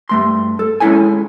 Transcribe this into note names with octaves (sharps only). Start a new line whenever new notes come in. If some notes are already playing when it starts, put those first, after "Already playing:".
G2 A3 C6
A4
G#3 C#4 D#4 E4 A4 G#5